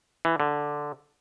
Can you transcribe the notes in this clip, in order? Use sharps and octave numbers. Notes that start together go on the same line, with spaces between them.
E3
D3